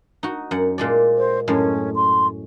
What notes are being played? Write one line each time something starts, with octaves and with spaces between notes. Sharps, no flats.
D#4 F#4
F#2 F#5
A#2 G#3 D5
C5
F#2 A2 G#3 C#4
C6